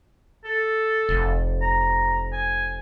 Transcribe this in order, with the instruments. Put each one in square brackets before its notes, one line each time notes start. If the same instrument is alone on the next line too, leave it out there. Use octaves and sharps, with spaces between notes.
[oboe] A4
[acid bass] F1
[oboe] A#5
G#5